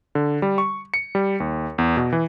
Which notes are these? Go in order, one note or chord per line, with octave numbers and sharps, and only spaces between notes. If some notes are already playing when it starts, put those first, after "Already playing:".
D3
G3
C#6
C#7
G3
D#2
E2
B2
E3